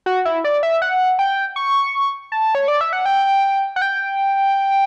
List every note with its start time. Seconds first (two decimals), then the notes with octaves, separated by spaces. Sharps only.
0.06 F#4
0.25 E4
0.44 D5
0.63 E5
0.82 F#5
1.19 G5
1.56 C#6
2.32 A5
2.55 C#5
2.68 D5
2.81 E5
2.93 F#5
3.06 G5
3.76 F#5
3.82 G5